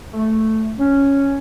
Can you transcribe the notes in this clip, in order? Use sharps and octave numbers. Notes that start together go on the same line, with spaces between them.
A3
C#4